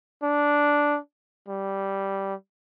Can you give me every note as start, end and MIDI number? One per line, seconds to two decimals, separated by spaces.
0.23 0.99 62
1.48 2.34 55